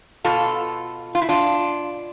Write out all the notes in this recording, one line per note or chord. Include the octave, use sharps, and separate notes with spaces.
B2 F4 A4
F4
E4
D4 F4